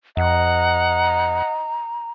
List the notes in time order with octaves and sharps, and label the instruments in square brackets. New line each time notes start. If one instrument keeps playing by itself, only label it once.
[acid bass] F2 [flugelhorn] D#5 [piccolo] F#5 [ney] A#5